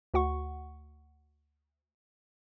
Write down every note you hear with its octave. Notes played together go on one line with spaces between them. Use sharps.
D2 F#4 F#5 C#6